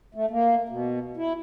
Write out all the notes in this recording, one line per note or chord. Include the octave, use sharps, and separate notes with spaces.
A3
A#3
B2
E4